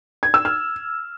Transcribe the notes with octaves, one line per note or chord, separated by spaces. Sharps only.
G#6
E6
F6